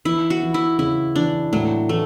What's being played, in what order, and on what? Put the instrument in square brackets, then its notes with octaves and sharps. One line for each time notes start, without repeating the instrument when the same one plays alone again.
[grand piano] E3 [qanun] E4
[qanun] F#4
[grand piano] E3
[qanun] E4
[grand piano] C#3 [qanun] E4
[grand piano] E3 [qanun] D4
[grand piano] A2 [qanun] F#3
[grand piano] E3 [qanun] A3